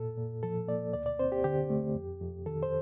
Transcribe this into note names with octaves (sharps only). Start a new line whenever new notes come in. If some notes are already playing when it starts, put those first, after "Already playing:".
Already playing: A#2 A4
A#2
F3 A4
A#3 D5
D2 D5
D5
C4 C5
G4
D3 G4
A3
F2
F2
D#3 A4
C5